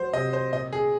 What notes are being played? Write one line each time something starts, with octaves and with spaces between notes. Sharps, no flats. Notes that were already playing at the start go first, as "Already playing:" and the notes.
Already playing: F#3 C5
C3 D#5
C5
A#2 D#5
G#4